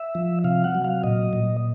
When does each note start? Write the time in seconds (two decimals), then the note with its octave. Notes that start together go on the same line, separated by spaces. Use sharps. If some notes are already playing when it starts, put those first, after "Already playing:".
Already playing: E5
0.15 F3
0.44 C3 F5
0.64 F#5
0.75 F#3
0.84 F5
1.03 A#2 D#5
1.33 A#2